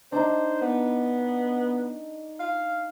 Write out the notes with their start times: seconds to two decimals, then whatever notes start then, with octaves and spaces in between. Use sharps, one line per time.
0.12 D4 D#4 C5
0.62 B3
2.40 F5